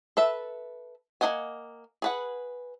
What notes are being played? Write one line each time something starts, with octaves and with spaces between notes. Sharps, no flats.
A4 B4 E5
A#3 F4 D#5 F#5 G#5
G#4 B4 F#5